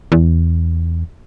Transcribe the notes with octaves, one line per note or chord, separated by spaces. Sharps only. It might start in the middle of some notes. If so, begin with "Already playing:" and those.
E2